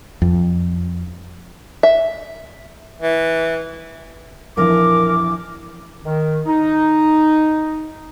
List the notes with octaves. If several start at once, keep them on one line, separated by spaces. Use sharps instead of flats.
F2
E5
E3
A#1 F2 E3 A#4 D6
D#3
D#4